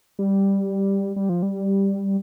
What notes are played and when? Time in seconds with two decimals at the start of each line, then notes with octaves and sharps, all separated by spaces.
0.19 G3
1.16 G3
1.29 F3
1.42 G3